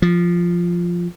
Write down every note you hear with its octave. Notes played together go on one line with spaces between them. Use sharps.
F3